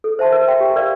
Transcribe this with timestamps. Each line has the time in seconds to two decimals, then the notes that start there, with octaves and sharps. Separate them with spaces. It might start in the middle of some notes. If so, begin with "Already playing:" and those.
0.04 A4
0.19 C5 E5 A5 C6
0.32 A#4
0.47 E5 G5 C6
0.61 G4
0.76 A#4 D5 F5